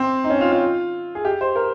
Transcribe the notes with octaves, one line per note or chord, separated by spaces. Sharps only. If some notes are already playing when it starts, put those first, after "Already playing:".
Already playing: C4
D#4
C#4
F4
F4
G#4
G4
C5
A#4